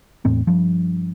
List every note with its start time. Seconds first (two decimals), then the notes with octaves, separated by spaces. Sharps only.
0.25 E2 A2 C4
0.47 G2 F3